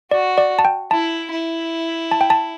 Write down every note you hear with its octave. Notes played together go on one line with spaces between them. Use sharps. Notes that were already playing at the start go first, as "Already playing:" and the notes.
F#4 D5
D5
A5
G5
E4 A5
E4
A5
G5
A5